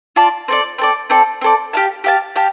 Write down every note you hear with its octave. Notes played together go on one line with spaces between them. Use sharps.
F4 D5 A5
C4 A4 D5
C4 A4 D5
C4 A4 D5
C4 A4 D5
G4 F5 A5
G4 F5 A5
G4 F5 A5